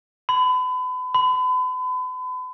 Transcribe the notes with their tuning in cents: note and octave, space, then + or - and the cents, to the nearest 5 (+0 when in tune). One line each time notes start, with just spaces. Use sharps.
B5 +35
B5 +40